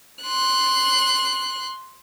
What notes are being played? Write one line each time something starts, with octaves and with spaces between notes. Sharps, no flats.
C6 F#6